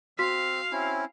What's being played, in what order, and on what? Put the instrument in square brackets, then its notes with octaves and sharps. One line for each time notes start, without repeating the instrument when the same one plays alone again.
[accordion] C4 [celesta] F#4 C6 B6 [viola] F5
[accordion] C4 C#4 E4